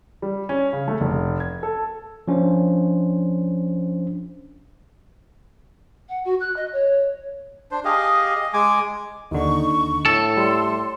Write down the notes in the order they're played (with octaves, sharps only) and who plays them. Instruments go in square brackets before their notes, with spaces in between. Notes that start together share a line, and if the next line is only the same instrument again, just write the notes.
[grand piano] G3
C#4
C#3
A3
F1
G#6
A4
[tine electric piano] F3 C#4 D4 C5
[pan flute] F#5
F#4
F#6
D#5
C#5
[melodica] D4 C5
G4 G#4 D#5 F5
D#5
G#3 G#5 D6
[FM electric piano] D#2 D3 [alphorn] D#4 [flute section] C#6
[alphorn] A2 [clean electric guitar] A4
[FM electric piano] G3 [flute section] C6